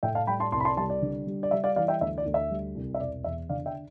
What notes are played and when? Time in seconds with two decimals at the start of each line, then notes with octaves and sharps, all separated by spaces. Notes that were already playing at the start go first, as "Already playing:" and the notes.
0.03 A2 E5 G5
0.15 F5 A5
0.27 G3 G5 B5
0.40 A5 C6
0.52 C2 A5 C6
0.60 B5
0.65 A5 C6
0.77 G3 A5 C6
0.90 D5
1.02 D3
1.27 G3
1.43 D5
1.51 G3 E5
1.64 D5 F5
1.76 E3 D5 F5
1.88 E5 G5
2.01 D2 E5
2.18 D5
2.26 D2
2.34 E5
2.50 G3
2.75 C2
2.94 E5
3.00 E1 D5
3.24 E2 E5
3.49 D3 D5 F5
3.66 E5 G5